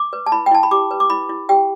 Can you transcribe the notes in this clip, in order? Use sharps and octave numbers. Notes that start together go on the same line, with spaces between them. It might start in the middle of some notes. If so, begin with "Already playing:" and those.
Already playing: D6
B4
A5
E4 B5
G5
E4 A5
B5
G4 D6
B4
D6
E4 B5
E4
G4 G5